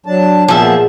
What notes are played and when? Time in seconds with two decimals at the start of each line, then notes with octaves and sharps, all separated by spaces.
0.06 F#3 D4 A5
0.48 A#2 F3 B3 G#4 E5 A5